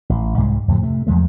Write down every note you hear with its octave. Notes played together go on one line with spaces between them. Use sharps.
A1
C2 G#2 G3 G#3
F2 A2 D3 F#3
C3 A3
E2 F3 G#3 A3